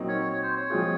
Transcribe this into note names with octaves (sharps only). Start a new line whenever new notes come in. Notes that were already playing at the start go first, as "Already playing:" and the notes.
Already playing: A#2 F#3 C4 D#4
C#5
C#5
C5
C#5
F3 G#3 C4 F4 G#4